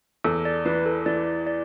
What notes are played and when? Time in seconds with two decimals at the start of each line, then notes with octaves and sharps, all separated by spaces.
0.24 E2 A4
0.45 D5
0.65 E3 B4
0.86 A4
1.06 E3 D5
1.47 D5